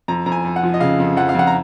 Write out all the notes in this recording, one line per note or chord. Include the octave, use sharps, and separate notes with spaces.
F2 A#5
F2 A#5
G#5
F2
F#5
F3
D#5
C#3 F5
F2
F2 F#5
F5
F2 F#5
A#5